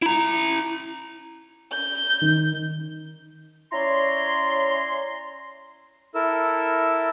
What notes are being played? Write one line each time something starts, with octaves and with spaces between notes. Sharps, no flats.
E4 A#5
G6
D#3
C#4 E4 C#5 D5 A#5 C6
E4 A4 A#4 E6